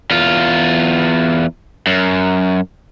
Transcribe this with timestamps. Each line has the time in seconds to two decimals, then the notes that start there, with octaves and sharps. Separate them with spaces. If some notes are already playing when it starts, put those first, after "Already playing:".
0.11 E2 F4
1.87 F#2